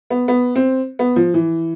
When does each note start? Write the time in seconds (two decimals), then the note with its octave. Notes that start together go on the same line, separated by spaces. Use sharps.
0.10 B3
0.28 B3
0.56 C4
0.99 B3
1.16 F3
1.34 E3